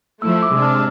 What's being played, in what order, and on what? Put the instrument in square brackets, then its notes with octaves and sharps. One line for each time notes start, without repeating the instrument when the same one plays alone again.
[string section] F3 A3 E4 [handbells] E6
[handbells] E6
D6
[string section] C3 G#3 D4 [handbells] E6
[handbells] F6
F6